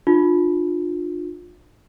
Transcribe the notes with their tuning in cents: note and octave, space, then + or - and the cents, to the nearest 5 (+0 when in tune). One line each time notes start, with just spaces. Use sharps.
D4 +45 F4 +25